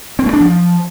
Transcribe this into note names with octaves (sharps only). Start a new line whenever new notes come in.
C4
A3
D4
F3